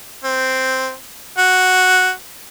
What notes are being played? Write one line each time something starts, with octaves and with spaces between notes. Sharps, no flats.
C4
F#4